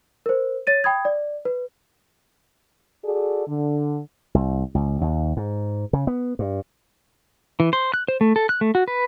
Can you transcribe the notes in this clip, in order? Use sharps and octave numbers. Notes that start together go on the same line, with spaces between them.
A#4 C5
C#5 A6 D#7
G5 B5 D#6 G#6
D5
B4
F#4 G#4 A4 D5
D3
C2
C#2
D#2
G#2
C#3
B3
G2
E3
C5
F#6
C5
A3
A4
F#6
A3
F#4
B4